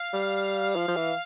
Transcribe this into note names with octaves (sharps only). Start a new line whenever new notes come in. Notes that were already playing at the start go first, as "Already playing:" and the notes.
Already playing: F5
G3
F3
F3
E3